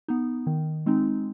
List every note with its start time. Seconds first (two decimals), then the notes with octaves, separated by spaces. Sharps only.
0.08 B3 D#4
0.47 D#3
0.86 G#3 C4 D#4